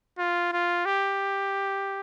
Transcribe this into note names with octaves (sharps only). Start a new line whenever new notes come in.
F4
F4
G4